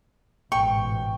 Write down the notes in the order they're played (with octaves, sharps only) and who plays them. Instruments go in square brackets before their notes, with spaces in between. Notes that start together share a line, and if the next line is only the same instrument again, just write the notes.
[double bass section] A1 G#2 B2 [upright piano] G5 [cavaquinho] C#6